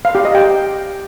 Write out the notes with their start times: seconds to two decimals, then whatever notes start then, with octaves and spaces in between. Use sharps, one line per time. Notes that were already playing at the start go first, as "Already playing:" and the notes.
0.05 F5
0.15 G4
0.25 D#5
0.35 G5